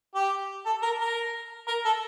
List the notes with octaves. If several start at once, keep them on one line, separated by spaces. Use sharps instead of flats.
G4
A4
A#4
A#4
A#4
A4